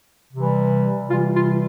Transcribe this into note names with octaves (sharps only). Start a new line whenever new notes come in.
C3 E3 G3
C3 E3 G3 F4
F4